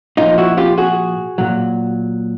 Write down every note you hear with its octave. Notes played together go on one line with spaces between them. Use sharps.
A#2 F3 D#4 F4
E4 F#4
F4 G4
F#4 G#4
A#2 F#3